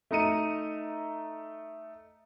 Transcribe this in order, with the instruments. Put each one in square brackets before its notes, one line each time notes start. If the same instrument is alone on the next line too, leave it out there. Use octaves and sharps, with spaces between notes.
[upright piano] A3 D#4 A#5 C#7 D#7